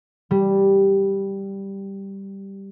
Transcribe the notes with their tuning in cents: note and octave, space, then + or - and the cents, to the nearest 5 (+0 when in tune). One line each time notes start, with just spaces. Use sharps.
G3 +0